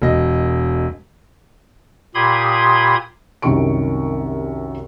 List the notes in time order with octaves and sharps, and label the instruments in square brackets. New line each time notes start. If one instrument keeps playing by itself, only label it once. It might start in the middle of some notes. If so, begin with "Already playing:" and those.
[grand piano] E1 D#5
[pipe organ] A#2 G4 B5 C6 D#6 G#6
[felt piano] C2 F#2 C3 D#3 C#6 D7